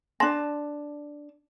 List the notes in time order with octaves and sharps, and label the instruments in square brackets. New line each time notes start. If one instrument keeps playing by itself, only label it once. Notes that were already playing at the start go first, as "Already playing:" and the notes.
[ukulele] D4 A5 [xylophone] C6 A#6